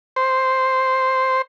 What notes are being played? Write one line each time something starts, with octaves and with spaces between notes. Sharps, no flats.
C5